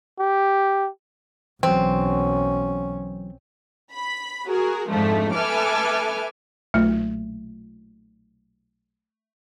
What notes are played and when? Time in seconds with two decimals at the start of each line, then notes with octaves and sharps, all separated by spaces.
0.20 G4
1.63 B1 E3 F#3 C4 C#4
3.91 B5
4.49 F#4 G#4 A#4
4.91 F2 G#2 D3 F3 G#3 A3
5.34 A4 B4 E5 G#5 D6 F6
6.74 B1 A#2 A3